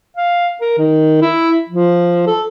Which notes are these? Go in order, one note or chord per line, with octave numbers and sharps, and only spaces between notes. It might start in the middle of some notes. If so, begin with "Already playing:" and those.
F5
A#4
D#3
E4
F3
A4